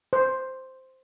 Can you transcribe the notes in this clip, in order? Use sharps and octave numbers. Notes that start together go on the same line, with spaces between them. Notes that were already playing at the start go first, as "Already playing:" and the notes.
C5